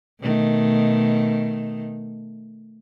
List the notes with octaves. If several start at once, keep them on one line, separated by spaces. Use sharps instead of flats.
B2 D#3 A3